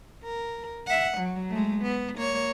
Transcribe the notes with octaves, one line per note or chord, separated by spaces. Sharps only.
A#4
E5 F#5
F#3
G#3 A3
B3
A#3 C#5